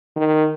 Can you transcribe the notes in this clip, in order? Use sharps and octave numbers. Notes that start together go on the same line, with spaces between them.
D#3